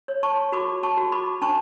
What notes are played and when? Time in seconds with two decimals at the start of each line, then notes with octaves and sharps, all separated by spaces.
0.08 C#5
0.23 A5 C#6
0.52 F#4 B5 D6
0.83 A5 C#6
0.97 F#4
1.12 B5 D6
1.42 D4 A5 C#6